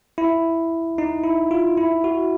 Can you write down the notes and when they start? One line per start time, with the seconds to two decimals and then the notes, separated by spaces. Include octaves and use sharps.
0.18 E4
0.98 D#4
1.24 E4
1.51 F4
1.77 E4
2.04 F#4